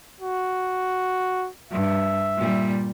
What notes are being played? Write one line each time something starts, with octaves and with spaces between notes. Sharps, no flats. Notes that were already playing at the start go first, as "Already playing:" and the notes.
F#4
G2 E5
A#2 G3